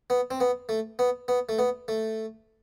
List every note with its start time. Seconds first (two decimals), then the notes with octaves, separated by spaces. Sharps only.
0.10 B3
0.31 C4
0.40 B3
0.69 A3
0.99 B3
1.28 B3
1.49 A3
1.59 B3
1.88 A3